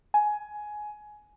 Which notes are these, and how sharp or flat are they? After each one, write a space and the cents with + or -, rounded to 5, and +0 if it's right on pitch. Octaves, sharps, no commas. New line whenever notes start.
G#5 +15